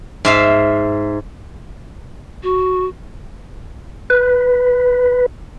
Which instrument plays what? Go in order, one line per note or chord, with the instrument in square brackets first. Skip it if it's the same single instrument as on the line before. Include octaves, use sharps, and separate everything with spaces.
[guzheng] G#2 E5 F5
[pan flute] F#4
[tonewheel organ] B4